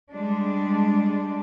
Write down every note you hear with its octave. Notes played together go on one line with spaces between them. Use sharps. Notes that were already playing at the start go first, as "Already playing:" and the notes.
G3 G#3 D4